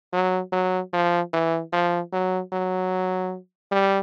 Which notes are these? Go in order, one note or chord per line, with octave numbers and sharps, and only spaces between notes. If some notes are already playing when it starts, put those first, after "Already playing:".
F#3
F#3
F3
E3
F3
F#3
F#3
G3